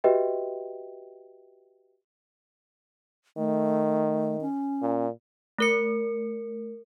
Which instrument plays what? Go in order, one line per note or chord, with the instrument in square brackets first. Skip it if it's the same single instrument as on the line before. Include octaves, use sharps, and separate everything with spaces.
[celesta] F#4 G4 B4 D#5 E5 G5
[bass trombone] D#3 [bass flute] A3
[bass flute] C#4
[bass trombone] A#2
[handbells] A3 A#4 C#7